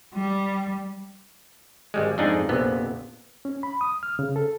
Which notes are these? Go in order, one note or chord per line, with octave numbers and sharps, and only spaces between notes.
G3
G#1 G3 G#3
F2 G#2 D4 D#4 G#4
A#1 F2 C3 B3
C#4
B5
D#6
F6
C#3
A4